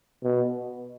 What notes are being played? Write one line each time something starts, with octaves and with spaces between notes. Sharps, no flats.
B2